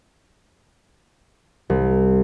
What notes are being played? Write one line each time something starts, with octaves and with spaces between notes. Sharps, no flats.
C2